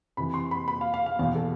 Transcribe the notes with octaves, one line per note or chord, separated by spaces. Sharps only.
F2 C3 E3 B5
C6
B5
B5
F5
F5
F5
E2 B2 F5
A4